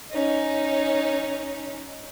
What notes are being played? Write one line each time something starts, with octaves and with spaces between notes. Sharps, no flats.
C#4 D#4